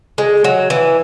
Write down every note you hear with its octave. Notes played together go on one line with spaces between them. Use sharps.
G#3
F#3
E3